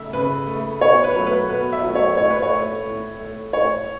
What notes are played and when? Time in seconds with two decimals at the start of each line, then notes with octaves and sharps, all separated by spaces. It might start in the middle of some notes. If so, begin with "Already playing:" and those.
Already playing: C#3 A3 E5
0.13 C#3 B4
0.47 A3
0.81 B2 C#5
1.04 B4
1.15 F#3 A3
1.27 B4
1.49 B2 B4
1.73 E5
1.83 F#3 A3
1.95 C#5
2.17 A2 C#5
2.30 B4
2.42 C#5
2.51 A3
2.86 A2
3.19 A3
3.53 A2 C#5